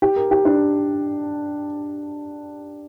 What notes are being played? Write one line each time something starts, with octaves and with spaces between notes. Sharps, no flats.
G4
A#4
G4
D4